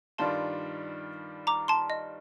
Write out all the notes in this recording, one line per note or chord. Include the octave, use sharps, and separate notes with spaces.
G2 D#3 G3 D4 F4 A5 C6
A#5 D6
A5 C6
D#5